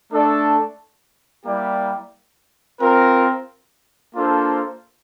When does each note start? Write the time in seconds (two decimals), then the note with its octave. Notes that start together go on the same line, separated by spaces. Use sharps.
0.11 A3 D4 A4 D5
1.45 G3 A#3 E4 G4 D5
2.80 C4 F4 A#4
4.15 A#3 D4 F4 A4 C5